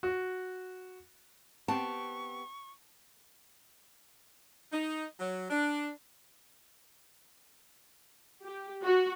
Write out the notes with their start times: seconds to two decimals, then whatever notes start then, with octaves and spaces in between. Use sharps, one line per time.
0.03 F#4
1.68 B3 C4 G4 A5 C#6
4.72 D#4
5.19 F#3
5.50 D4
8.43 G4
8.84 F#4